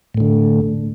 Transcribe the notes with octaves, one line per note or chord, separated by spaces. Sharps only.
A2 D3 A3